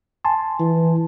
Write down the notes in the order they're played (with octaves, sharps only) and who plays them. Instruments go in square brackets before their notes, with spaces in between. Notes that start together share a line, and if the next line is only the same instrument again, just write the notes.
[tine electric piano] G#5 A5 C6
[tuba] E3